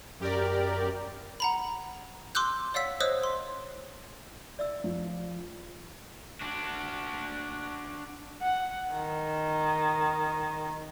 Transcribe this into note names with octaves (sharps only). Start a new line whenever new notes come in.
F#2 G4 A#4 D5
F#5 A#5 B5
C6 D6 E6 F#6 G6
C#5 D5 F5 F#5 E6 B6
C5 C#5 D#5 D#6 E6 F#6
C6
D5 E5 E6
F3
D4 F#4
F#5
D#3